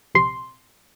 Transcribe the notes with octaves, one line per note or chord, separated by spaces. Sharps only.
A#1 C3 C6